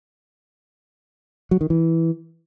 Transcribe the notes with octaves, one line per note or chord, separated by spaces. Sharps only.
F#3
D#3
E3